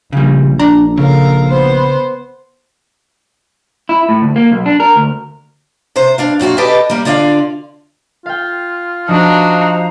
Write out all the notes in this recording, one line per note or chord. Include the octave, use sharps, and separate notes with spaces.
A#1 C#3 G3
D4 A#5
C#3 A4 A#4 F5
B3 C5
E4
A2
D2
A#3
B1
D4
A#4
D2
C3 C5
G2 D4 F5
F#2 A#2 F#4 F5
G4 A4 B4 D5 D#5 A5
G3 A#3
D3 F4 D5 D#5 F5
F4 F5 G5
F3 D4 D#4 F#4 C5 D#5 F5 A#5